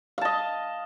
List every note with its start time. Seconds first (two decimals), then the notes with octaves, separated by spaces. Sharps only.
0.18 F5
0.21 A5
0.25 D#5